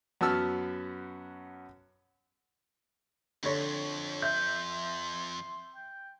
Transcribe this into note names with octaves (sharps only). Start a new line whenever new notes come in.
F#2 B3 F#4 A5 E6 F6
F2 D3 C#5 C6
E5 C6 G6
G5